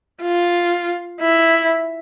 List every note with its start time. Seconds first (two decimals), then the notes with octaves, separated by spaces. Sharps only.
0.22 F4
1.21 E4